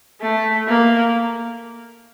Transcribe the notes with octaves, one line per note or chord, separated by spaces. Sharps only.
A3
A#3